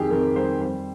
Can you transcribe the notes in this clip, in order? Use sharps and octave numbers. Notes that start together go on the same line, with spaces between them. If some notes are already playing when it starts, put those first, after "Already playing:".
Already playing: F2 D#3 G4 G#4
F2 A#4
G3 C5
G3 C5